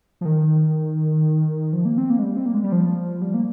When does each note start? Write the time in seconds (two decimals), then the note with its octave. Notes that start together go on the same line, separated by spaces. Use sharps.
0.21 F3
0.25 D#3
1.73 F3
1.85 A#3
1.98 C4
2.10 A#3
2.19 G#3
2.23 G3
2.37 C4
2.46 A#3
2.54 G#3
2.64 G3
2.72 F3
3.22 G3
3.34 A#3